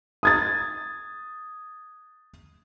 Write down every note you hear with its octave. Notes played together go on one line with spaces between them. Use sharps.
D#6 G#6 A6